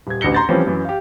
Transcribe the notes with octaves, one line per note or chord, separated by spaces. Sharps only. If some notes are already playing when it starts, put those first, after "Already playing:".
D#1 G#6
A1 D2 A#6 C#7 G7
A#5 C6 G6 A6
E3 F3 G3 C4 C#4
F#2 E3
G4 F5